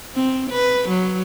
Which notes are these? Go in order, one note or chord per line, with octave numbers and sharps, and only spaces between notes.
C4
B4
F#3